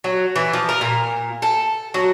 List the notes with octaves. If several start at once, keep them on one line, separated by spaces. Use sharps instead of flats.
F#3
E3
F3
A#4
A#2
A4
F#3